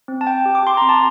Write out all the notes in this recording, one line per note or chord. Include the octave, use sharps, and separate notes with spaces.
C4
A5
C4 G5
G4
D6
G4 C6
C4 A#5
A5